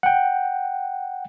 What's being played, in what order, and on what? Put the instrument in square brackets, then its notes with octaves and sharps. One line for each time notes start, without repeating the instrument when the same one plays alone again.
[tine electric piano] F#5 G5